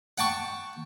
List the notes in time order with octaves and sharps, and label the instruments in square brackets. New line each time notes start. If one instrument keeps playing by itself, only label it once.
[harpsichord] F#5 G5 A5 C#6